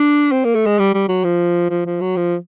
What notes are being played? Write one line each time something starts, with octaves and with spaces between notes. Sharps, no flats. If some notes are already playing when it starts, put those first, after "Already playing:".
Already playing: D4
C4
A#3
A3
G#3
G3
G3
F#3
F3
F3
F3
F#3
F3